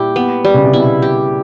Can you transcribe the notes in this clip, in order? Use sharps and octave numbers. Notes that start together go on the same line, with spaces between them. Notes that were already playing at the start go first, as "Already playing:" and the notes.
Already playing: A#2 G3 E4 G4
B3
G3
C#3
C3
B2 E4
G4